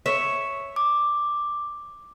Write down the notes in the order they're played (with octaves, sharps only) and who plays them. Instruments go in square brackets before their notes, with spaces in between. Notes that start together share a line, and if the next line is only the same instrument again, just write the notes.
[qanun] C#5 E5
[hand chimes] D6